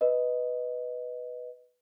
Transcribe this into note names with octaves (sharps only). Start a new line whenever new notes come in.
B4 D#5